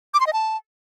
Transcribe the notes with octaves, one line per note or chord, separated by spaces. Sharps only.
D6
C6
D#5
A5